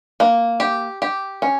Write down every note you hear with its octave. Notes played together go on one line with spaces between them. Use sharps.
A#3
G4
G4
C#4